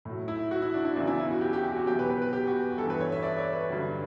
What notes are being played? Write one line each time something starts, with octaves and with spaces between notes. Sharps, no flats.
A2 F#3
E4
F#4
E4
D4
E4
E2 C#3 F#3 D4
E4
E4
F#4
G4
G4
G4
F#4
E2 B2 F#3 G4
B4
B4
B4
G4
F#4
G2 E3 A4
B4
C#5
E5
D5
C#5
B4
G2 D3 F#3